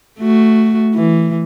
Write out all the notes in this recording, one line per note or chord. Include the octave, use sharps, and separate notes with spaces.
A3 F#4
E3